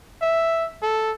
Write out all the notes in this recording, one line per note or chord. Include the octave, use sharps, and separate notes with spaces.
E5
A4